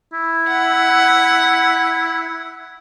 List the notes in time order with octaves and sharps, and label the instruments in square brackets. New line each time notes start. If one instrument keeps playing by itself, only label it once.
[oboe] E4
[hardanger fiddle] F#5